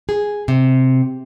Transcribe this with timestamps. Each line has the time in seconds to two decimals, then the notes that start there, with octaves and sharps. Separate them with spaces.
0.09 G#4
0.48 C3